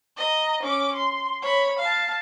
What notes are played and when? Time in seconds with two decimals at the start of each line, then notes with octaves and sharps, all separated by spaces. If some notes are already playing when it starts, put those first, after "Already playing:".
0.17 D#5 A#5
0.63 C#4 D6
0.96 C6
1.42 C#5 B5
1.79 F5 A5